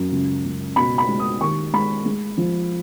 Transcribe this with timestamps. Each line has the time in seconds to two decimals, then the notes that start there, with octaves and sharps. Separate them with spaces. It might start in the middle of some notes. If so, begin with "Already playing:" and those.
Already playing: F#2
0.12 C#2
0.45 C#2
0.76 B2 B5
0.98 B5
1.08 G#3
1.19 D#6
1.41 D#2 C#6
1.73 G#3 B5
2.05 G#3
2.37 F3